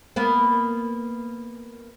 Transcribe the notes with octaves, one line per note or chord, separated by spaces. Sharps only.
A#3 B3